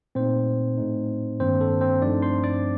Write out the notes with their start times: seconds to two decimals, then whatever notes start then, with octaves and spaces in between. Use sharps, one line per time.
0.15 A#2 A3 C4 D#4 C5
0.77 A2 A3 D#4
1.40 G2 D#3 A#3 C4 D4 C5
1.61 A4
1.81 C4 C5
2.02 G2 F3 A3 C4 D4 D#4 D5
2.22 C5 C6
2.44 D5 D6